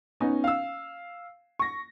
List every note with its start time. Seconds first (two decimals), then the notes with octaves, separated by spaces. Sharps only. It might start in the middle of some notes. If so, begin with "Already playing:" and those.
0.20 B3 C#4 D#4
0.44 F5 E6
1.59 C#6 A#6